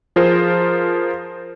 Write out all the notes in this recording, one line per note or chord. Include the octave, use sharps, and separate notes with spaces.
F3 F4 G#4 A#4 C5